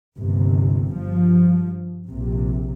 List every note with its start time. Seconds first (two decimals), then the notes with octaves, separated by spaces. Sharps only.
0.18 G1 D#2 C3
0.90 G2 F3
2.07 A#1 C3